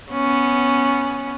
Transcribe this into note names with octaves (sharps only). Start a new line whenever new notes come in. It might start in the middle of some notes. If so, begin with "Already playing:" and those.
B3 C#4